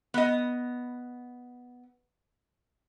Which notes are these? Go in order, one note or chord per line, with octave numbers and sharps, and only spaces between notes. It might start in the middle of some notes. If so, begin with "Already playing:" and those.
B3 D#5